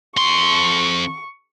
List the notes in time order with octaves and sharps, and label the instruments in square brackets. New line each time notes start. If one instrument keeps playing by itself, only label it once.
[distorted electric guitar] F2 C6 [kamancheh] C#6